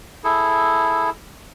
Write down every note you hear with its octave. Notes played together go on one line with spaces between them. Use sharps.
E4 G#4 A4